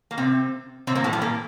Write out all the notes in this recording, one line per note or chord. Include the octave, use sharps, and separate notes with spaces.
A#3
C3 C4
C3 C4
A#2 A#3
A2 A3
G2 G3
A#2 A#3